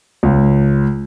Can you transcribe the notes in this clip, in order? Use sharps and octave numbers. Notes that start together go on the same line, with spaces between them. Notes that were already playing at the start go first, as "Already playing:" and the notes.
C#2